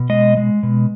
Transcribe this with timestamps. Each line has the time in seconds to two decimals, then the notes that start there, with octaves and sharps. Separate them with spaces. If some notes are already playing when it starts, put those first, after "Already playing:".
Already playing: B2
0.09 G#3 D#5
0.37 G#3
0.63 B2